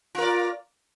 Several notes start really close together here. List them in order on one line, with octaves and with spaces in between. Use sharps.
F4 A#4 D5